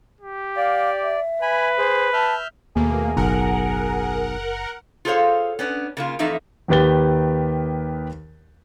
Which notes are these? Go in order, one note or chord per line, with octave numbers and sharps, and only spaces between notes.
G4
D5 F5
E5
B4 G#5 B5
G#4 C5
E5 A5 F6 G6
D#2 B2 A3 A#3 G#4
F#1 B1 A#4 F#5
F4 G#4 A4 C5 C#5 F5
B3 C#4 D4
C#3 A#3 F4
F2 E3 A3 D#4 E5
D#2 D#3 G4 B4 A6 G7